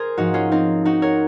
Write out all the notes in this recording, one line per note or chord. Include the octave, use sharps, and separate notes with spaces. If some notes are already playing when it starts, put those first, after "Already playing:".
Already playing: G#4 A#4 C5
G#2 F3 D#4 F#4
C#4 F4
C4 D#4
D#4 F#4
A#4 C#5